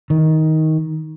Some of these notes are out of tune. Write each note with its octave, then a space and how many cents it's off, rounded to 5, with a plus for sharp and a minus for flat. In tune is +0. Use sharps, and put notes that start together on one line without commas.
D#3 +15